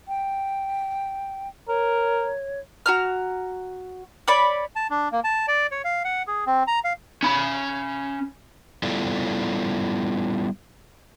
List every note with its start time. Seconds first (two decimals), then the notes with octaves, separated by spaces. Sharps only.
0.08 G5
1.68 A#4 C#5
2.86 F#4 A#5 F6
4.28 C#5 D5 B5 D6
4.76 A5
4.90 D4
5.12 A#3
5.24 A5
5.48 D5
5.71 C#5
5.85 F5
6.05 F#5
6.28 G#4
6.47 C4
6.67 A#5
6.84 F5
7.23 C#4 B5
8.83 G3 B3 E4 F4 A4 D5